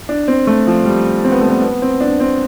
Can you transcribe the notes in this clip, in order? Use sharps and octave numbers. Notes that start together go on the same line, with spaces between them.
D4
C4
A3
F3
G3
C4
B3
A3
B3
B3
C4
D4
C4